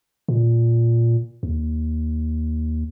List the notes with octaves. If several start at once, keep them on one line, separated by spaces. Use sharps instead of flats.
A#2
D#2